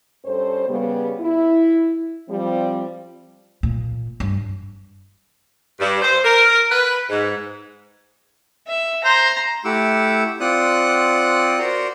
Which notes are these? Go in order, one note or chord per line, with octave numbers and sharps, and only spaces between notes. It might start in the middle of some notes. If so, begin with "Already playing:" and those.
G2 C#4 A4 C5
C#3 G3 B3
E4
F3 G3 C4
A#2
G2
G2
C5
A#4
B4
G#2
E5
C5 A#5
A3 E4 G4 F#5 D6 E6
C4 F4 D5 F#5 D#6 F#6
F#4 A#4 C5 D5 A#5 C6